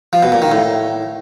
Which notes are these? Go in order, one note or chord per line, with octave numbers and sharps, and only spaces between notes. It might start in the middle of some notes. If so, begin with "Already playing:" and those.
F3
B2
A#2
D#3
A2